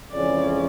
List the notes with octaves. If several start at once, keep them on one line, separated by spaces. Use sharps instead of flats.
F2 C#3 E3 G#3 C#4 D5